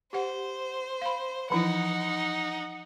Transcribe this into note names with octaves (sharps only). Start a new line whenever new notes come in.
G4 C5 F#5
F5 B5
E3 F3 D#4 E4 F#5